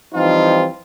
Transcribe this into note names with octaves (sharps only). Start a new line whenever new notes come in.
E3 F3 G3 C4 D#4 F4